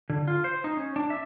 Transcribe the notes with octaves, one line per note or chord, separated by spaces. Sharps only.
D3
F4
C5
D#4
C#4
D4
E5